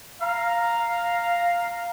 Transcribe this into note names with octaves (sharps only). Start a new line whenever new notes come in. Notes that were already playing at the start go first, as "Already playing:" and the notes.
F5 A#5